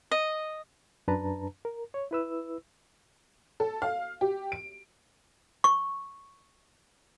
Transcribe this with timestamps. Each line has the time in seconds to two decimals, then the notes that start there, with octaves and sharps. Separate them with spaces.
0.11 D#5
1.08 F#2 D4 B4 A5 A#5
1.65 A#4
1.94 C#5
2.11 E4 B4 E6
3.60 A4
3.82 F5
4.21 G4
4.52 D7
5.64 C#6